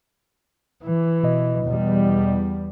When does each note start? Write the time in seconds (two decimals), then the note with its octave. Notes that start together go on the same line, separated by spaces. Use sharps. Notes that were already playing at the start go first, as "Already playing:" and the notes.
0.84 E3
1.23 B2 D#5
1.66 E2 G3